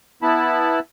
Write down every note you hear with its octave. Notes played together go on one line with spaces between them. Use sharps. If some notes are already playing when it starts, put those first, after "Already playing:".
B3 E4 A5 B5